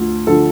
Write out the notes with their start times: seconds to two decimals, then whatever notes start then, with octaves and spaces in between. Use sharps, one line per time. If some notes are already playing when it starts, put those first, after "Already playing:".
Already playing: D2 F3
0.27 D3 F3 A4